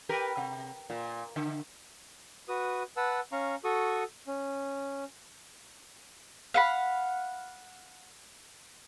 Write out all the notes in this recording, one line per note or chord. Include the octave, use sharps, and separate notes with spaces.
G4 A#4 B4
C3
A#2
D3
F#4 B4 D#6
B4 F#5 A5 E6
C#4 F5 A#5 C#6
F#4 A4 C#6 D#6
C#4
F5 F#5 B5